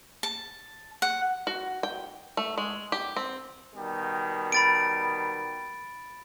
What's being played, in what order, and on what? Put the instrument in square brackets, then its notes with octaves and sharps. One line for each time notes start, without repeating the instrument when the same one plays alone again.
[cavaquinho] A5
F#5
[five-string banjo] F#4
G5
A3
G#3
G4
C4
[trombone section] B2 D#3 G3
[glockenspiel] B5 A6 D7